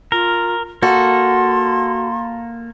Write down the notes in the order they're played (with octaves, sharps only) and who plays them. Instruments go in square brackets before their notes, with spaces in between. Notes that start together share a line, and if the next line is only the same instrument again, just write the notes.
[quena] F4 [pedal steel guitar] A#4
[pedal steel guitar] A#3 A4 [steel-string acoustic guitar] F#4 [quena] C6